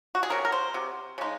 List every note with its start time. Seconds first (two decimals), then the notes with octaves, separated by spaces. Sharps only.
0.15 F#4
0.23 G#4
0.30 C3 F#3 C#4 A#4
0.45 A#4
0.52 C5
0.74 C3 F#3
1.18 C#3 G#3 D#4